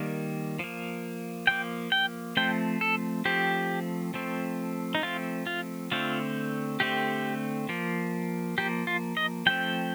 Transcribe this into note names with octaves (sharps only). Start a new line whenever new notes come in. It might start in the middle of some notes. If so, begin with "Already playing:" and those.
Already playing: D#3 G3 A#3
F3 A#3
F3 A#3 G5
G5
F3 A3 C4 G5
A4
F3 A3 C4 G4
F3 A3 C4
D#4
F3 A3 C4 F4
F4
D3 A3 C4 F4
D3 A3 C4 G4
F3 A#3
F3 A#3 G4
F4
D#5
F3 A3 C4 G5